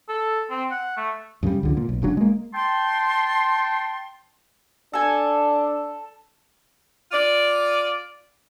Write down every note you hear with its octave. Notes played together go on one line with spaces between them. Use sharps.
A4
C4
F#5
A3
F#2 C#3 F#3 G3
C#2 D3 F3
A#2
B1
F#1 C#3 F#3 D4
G#3 A#3
G5 A5 C6
D4 A4 G#5
F4 D5